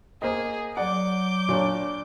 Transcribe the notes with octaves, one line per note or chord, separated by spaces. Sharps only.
A#3 G#4 C5 D#5
F#3 D5 F#5 D6 G6
A#2 D4 C#5